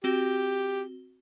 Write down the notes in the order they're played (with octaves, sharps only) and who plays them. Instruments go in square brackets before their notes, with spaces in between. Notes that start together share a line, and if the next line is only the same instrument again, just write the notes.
[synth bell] C4 F#4 G7 [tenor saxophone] G4